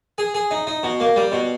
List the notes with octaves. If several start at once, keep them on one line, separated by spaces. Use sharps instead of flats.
G#4
G#4
D#4
D#4
B2
A#3
G3
B2